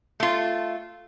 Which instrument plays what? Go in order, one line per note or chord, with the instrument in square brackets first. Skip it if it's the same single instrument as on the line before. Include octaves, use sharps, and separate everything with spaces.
[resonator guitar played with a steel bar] A3 F4